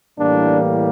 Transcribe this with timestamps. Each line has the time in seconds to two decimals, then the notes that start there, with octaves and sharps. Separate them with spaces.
0.19 A2 E3 G3 A#3 D4